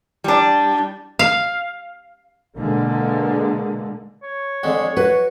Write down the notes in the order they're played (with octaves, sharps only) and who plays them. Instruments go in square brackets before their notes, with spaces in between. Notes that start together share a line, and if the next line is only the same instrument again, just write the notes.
[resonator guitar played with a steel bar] G3 D4
[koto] F5
[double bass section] B2 D3 G#3 A#3
[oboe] C#5
[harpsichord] F2 D3 G#3
[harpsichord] F#4 [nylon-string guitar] B4 D#5